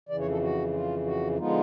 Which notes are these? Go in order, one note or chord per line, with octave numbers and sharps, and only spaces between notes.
F2 C#3 E3 D5
C#5
A4
F#4
F4
F#4
D3 F3 G#3 B3 D#4 F4